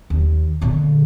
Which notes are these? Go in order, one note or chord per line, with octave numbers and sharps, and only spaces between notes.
D#2
A#2 D3